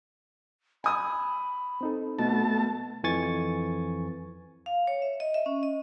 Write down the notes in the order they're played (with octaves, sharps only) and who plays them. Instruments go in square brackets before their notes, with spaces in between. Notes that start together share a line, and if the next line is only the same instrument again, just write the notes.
[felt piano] G#5 D#6 E6 [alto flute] B5
[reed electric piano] C4 D#4 A4
[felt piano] B2 [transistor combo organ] A3 A5 [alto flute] B3
[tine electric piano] F2 E3 G#5 C#6 A6
[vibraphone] F5
C#5
E5
D#5
E5
C#4
D#5